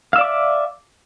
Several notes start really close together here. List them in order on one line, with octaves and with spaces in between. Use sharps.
F5 E6 D5 D6 E5